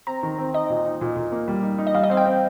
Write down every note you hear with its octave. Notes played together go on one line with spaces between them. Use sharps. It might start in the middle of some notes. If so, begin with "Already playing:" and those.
C4 A#5
D#3
C4
D#4 D#5
A#2
D#4
A#2
A#2
A#3
G3
D#4
D#4
D#5
G3 F5
D#5
C4 F5
G5
C4